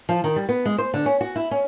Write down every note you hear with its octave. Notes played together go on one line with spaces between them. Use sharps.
F3
D#3
G3
B3
G#3
C5
D3
C#4
F#4
E4
C#4